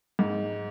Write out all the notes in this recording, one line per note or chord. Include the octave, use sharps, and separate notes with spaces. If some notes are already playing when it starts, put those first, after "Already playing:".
G#2